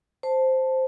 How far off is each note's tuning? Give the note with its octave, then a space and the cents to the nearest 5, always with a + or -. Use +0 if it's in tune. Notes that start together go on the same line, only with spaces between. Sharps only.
C5 +0 A5 +0